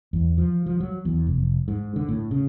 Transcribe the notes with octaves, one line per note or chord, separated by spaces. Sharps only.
E2
F3
F3
F#3
E2
F1
G#2
D3
A2
C#3